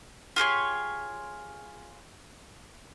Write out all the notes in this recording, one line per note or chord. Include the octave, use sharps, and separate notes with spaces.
F4 G4 G#4 C#5